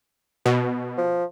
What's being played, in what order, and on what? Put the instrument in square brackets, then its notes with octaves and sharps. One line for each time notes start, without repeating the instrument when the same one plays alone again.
[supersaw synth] B2
[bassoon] F3